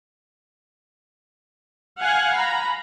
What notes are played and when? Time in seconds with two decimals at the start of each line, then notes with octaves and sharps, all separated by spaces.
1.99 F5 F#5 G#5
2.36 A#5 B5